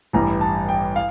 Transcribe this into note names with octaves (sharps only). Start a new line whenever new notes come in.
A1 G2 E3 G3 A#5
A5
G5
F5